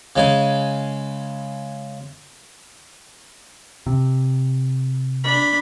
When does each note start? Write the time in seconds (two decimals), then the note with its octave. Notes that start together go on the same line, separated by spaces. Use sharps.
0.16 C#3 G#3 G#5
3.86 C3
5.24 D4 B5